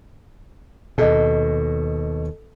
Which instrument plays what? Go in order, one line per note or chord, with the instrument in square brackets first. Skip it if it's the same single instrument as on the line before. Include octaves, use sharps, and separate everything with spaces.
[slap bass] D#2 B2 [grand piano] A4 D#5